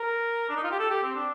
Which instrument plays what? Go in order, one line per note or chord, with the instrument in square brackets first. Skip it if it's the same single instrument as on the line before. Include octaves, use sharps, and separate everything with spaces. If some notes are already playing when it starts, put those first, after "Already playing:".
Already playing: [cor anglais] A#4
D4
D#4
F4
G4
A4
G4
C4
D4